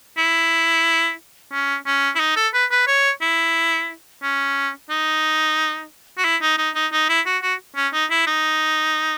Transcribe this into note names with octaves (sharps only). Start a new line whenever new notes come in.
E4
C#4
C#4
E4
D#4
A4
B4
B4
C#5
E4
C#4
D#4
F#4
E4
D#4
D#4
D#4
D#4
E4
F#4
F#4
C#4
D#4
E4
D#4